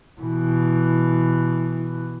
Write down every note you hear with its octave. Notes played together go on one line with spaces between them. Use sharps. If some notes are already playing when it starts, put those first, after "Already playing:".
B2 E3